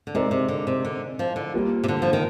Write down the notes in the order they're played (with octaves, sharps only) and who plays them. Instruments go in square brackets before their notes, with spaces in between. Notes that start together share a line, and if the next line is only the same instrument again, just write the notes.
[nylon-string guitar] D3
[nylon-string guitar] C3 [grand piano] G#3 D#4 A#4 D5
[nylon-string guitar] C3
D3
C3
D3
F3
D3
[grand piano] G3 A#3 F4
[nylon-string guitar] C3
D3
F3
D#3